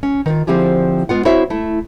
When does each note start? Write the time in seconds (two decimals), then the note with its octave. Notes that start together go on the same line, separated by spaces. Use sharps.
0.03 C#4
0.26 D#3 F4
0.47 D3 F3 C4 E4 G4 G#4
1.09 G#3 B3 F4 F#5
1.25 C4 E4 F#4 C5 C#5 E5
1.50 A3 E4